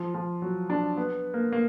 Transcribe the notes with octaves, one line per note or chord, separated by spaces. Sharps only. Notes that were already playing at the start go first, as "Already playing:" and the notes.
Already playing: F3
F3
F#3
D4
B3
A#3
A#3